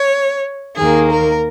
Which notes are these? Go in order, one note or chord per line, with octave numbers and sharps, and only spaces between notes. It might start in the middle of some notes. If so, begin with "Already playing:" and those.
Already playing: C#5
D#2 D#3 A#3 G#4
A#4